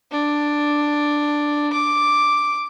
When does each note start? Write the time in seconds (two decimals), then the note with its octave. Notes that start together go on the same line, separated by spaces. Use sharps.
0.11 D4
1.73 D6